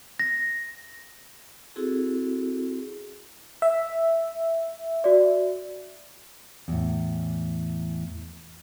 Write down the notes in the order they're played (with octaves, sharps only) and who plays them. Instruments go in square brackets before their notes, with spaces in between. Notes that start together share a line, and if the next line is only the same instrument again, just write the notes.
[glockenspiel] A#6
[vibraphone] C4 E4 F#4 G#4 A4
[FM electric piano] E5
[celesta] F#4 D5
[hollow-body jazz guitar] E2 A2